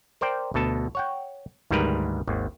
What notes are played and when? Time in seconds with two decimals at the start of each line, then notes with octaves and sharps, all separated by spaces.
0.21 A#4 C5 D5 G5
0.54 D2 B2 A4 A5
0.95 C#5 F#5 G5
1.71 D2 G#2 D#3 G3 A#4 B4
2.27 G#1 D#2